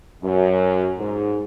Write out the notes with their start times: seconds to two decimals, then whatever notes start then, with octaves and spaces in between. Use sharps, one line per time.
0.24 F#2
0.99 G#2